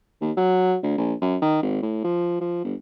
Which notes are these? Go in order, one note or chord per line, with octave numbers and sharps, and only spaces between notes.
D#2
F#3
D2
A#1
F#2
D#3
G#1
A2
F3
F3
G1